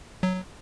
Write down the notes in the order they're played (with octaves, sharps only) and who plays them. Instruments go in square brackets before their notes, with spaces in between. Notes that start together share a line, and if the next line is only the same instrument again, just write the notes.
[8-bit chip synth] F#3